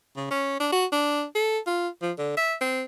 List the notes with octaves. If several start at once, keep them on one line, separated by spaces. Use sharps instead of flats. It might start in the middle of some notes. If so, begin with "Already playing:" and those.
C#3
C#4
D4
F#4
D4
A4
F4
F3
D3
E5
C4